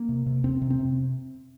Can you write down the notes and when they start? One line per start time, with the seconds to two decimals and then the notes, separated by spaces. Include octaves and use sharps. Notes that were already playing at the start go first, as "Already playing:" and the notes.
Already playing: A#3
0.09 C3
0.26 C3
0.44 F2 C4
0.62 C3
0.70 C4
0.79 C3